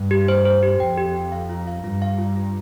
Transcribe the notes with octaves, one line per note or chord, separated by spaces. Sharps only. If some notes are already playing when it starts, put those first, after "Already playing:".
Already playing: G2
G4
C5
C5
G4
F2 G5
G4
G5
F5
F4
F5
G2 F4
F5
F4
F4